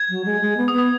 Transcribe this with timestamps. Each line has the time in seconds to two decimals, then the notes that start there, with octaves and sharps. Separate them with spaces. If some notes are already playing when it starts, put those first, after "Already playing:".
Already playing: G#6
0.10 F#3
0.25 G#3
0.41 G#3
0.57 B3
0.68 D#6
0.73 B3
0.78 D#6